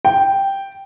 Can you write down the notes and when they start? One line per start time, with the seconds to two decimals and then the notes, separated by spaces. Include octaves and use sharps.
0.05 G5